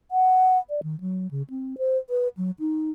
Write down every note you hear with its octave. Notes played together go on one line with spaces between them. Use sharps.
F#5
D5
D#3
F#3
C#3
C4
C5
B4
F#3
D#4